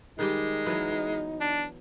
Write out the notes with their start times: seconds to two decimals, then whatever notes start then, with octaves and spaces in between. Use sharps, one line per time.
0.19 D#3 G3 G#3 D#4 G4
0.66 E3 F#3 B3
1.41 D4